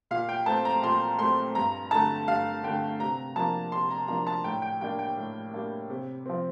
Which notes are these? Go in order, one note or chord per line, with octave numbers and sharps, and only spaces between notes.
A#2 F5
G5
A3 C4 A5
A#5
A#2 C6
A3 C4 C6
G2 A#5
D3 A3 A5
G2 F5
D3 A3 G5
C3 A#5
F3 A#3 D4 A5
C3 C6
A#5
F3 A#3 D4 A#5
A5
A2 G5
G5
G3 A#3 D4 G5
G5
A2
G3 A#3 D4
C3
F3 C4